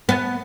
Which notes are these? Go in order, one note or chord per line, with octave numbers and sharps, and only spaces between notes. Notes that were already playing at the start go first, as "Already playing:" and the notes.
B3